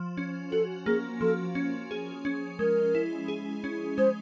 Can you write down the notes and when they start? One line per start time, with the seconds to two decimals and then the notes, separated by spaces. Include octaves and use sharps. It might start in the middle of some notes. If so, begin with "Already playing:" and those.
Already playing: F3
0.17 C#4
0.52 F#4 A4
0.86 A#3 G#4
1.21 F3 A4
1.55 C#4
1.91 G#4
2.25 C#4
2.59 G#3 A#4
2.95 E4
3.28 G#4
3.64 C#4
3.98 G#3 C5